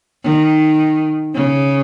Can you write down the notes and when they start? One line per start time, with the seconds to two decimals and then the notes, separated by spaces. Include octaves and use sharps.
0.23 D#3
1.34 C#3